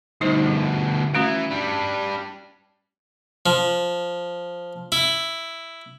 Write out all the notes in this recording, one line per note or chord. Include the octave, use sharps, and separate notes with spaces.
D2 B2 G3 D#4 C5
F3
E3 A3 C#4 F#4
G3 D4
F3
E4